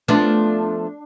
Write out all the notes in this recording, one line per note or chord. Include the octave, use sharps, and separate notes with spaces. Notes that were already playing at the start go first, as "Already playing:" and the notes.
F3 A3 B3 D4